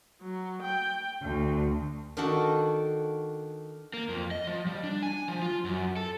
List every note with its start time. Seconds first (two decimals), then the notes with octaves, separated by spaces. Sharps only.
0.21 F#3
0.62 G5
1.22 D2
2.17 D#3 D4 F#4 A4
3.94 A#3
4.09 F2
4.31 D#5
4.47 F3
4.66 G3
4.83 D4
5.03 G#5
5.28 F3
5.42 F4
5.65 F#2
5.96 A4